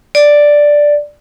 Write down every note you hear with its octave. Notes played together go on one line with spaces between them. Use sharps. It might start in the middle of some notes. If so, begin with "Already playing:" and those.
D5